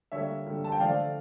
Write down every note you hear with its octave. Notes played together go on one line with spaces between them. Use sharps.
D3 G3 A#3 C#5 E5
D3 G3 A#3
A5
G5
D3 F3 A3 D5 F5